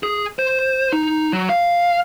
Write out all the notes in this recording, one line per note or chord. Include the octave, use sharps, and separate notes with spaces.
G#4
C5
D#4
F#3
F5